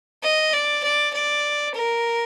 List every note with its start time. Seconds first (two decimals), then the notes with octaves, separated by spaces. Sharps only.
0.23 D#5
0.53 D5
0.84 D5
1.14 D5
1.75 A#4